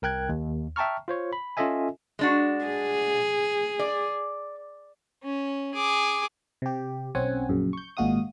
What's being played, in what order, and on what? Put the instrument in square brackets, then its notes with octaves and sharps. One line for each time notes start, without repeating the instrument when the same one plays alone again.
[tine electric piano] C2 A#4 G5 F#6 G#6
D#2
E5 G5 A5 A#5 C#6 F6
F4 C5 C#5
B5
C#4 F4 A4 D#5 E5 G#5
[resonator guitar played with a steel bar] G#3 D4 F#4
[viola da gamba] G#4
[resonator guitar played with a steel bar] D5
[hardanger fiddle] C#4
G#4 D6
[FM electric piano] C3 G4
B1 C4 C#4 F#5 G#5
A#1 F#2 C#3
C#6 G6
G#1 A#2 G#3 F#4 F5 D#6